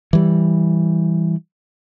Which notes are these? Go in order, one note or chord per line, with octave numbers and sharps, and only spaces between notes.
E3 G3